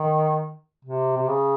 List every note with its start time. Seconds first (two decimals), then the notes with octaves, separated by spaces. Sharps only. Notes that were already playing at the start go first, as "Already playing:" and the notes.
Already playing: D#3
0.85 C3
1.17 C3
1.28 C#3